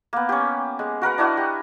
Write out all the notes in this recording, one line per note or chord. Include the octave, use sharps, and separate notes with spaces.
A#3 B3
C#4 G4
G#3
F#4 A#4 B4 F#5
D4 E4 F#4 D#5
G4